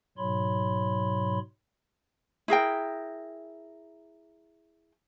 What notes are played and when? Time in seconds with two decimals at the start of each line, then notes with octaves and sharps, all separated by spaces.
0.18 G#2 B2 F#3 C#5 B5 C6
2.48 E4 G#4 A#4 G5